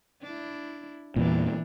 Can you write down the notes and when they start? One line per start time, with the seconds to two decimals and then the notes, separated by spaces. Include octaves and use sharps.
0.22 D4 E4
1.16 E2 A#2 E3 D4